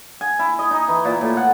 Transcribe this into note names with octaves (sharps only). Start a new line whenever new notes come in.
G#5
E4
D#5
D#4
E3
A#2
A2
F#5